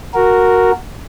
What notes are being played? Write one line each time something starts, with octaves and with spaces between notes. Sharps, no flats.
F#4 A#4